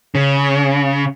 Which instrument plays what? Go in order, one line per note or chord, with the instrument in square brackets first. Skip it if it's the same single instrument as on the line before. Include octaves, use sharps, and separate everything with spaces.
[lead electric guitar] C#3